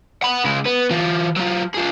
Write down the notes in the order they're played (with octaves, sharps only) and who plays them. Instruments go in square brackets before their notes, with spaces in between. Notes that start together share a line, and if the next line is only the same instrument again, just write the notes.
[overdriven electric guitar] F#5 B5
C#3 G#3
B3
E3 F4
F#3 F4
F4 G#4